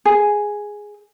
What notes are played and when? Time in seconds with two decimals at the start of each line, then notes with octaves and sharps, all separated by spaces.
0.05 G#4